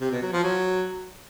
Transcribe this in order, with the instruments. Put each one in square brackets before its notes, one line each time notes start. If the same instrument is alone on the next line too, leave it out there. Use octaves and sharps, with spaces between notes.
[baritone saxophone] C3
B2
F#3
F3
F#3